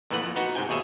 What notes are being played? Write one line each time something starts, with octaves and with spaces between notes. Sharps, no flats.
F2 A#2 E3 A3 B4 F#5
F2 A#2
B3 D#4 F#4
G#2 C3 G5 G#5
D#2 B2 G#4 C#5 E5